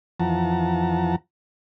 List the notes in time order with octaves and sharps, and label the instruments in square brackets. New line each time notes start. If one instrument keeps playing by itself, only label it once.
[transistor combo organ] F2 E3 F3 F#5 A5 A#5